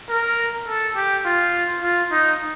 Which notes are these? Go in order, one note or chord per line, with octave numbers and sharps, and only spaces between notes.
A#4
A4
G4
F4
F4
D#4